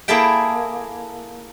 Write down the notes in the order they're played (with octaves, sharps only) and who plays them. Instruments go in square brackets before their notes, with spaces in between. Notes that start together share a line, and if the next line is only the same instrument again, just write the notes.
[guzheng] A#3 E4 G#4 A4 E5 G5